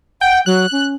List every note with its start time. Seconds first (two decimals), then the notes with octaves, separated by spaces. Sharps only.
0.21 F#5 G5
0.46 F#3 F#6
0.72 C#4